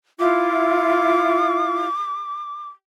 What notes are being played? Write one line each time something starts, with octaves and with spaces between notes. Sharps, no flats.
E4 F4 D6